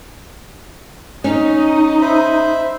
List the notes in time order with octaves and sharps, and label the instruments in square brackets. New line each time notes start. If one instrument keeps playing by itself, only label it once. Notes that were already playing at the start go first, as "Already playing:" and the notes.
[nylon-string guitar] C#4 [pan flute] D#4 [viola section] D#5
[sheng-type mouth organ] C5 E5 B5